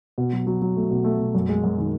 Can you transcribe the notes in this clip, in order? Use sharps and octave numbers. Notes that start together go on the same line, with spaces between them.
B2
F#3
F#3
F#3
A3
B2
A3
B2
F#2
G#3
F#2
D#3